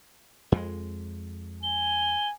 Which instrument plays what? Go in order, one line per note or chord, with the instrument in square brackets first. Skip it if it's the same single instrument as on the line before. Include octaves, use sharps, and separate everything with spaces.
[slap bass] F2 G#3
[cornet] G#5 [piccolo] G7